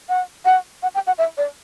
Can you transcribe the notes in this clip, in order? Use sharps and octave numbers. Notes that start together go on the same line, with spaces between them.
F#5
F#5
F#5
G5
F#5
E5
D5